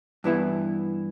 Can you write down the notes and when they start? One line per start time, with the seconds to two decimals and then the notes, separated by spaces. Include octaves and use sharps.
0.24 G2 E3 B3 E4